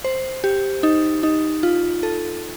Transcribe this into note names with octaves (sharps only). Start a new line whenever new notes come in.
C5
G4
D#4
D#4
F4
A4